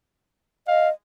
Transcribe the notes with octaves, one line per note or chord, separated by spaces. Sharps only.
D#5 F5